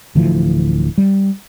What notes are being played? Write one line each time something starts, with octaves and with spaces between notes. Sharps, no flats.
D1 D2 E3 F3
G3